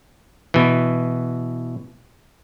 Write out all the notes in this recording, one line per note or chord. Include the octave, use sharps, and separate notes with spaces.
B2 E3